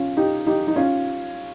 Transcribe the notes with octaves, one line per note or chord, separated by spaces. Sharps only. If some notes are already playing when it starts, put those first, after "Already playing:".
Already playing: C#4 F4
D#4 G4
D#4 G4
D#4
C#4 F4